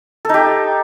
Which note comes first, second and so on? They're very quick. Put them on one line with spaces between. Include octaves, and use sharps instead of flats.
A4 D#4 G4